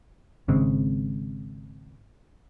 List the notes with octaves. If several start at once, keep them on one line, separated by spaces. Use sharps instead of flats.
G#1 C#3 G#3 C4